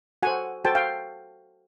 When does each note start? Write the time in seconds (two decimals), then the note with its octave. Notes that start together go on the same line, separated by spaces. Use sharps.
0.23 F#4 A4 C5 F#5 G#5
0.65 F#4 A4 C5 G5 A5
0.75 F5 G5